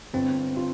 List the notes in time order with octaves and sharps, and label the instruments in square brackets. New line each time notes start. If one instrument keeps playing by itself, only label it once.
[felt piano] G1 [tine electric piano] C4
[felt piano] F4